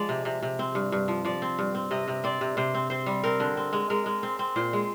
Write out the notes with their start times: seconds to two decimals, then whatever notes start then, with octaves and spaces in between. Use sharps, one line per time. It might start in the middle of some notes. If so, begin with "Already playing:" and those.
Already playing: F3 G#3 D5
0.09 C3
0.25 C3
0.43 C3
0.59 C4
0.75 G2
0.92 G2
1.08 F3
1.25 F3 D5
1.42 C4
1.59 G2
1.75 C4
1.91 C3 D#5
2.08 C3
2.24 C4 D5
2.41 C3
2.57 C3 C5
2.74 C4
2.90 C4 C5
3.06 G3
3.24 C4 A#4
3.40 D3
3.57 C4
3.73 G#3
3.90 G#3 A#4
4.06 G#3
4.23 C4
4.39 C4
4.56 A#2 C5
4.73 G#3